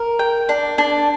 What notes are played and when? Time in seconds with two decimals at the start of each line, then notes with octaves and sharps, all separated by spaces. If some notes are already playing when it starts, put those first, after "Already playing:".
Already playing: A#4
0.19 G5
0.49 D4
0.78 D4